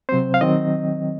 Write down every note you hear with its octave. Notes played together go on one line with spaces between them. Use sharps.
C3 F#3 C4 C5
F5
D#3 F#3 C4 D#5